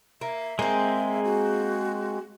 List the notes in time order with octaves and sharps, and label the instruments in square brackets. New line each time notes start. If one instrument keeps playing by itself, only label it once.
[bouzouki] A#3 [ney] E5
[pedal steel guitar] G#3 C4 [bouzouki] A#3 G#4
[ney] F#4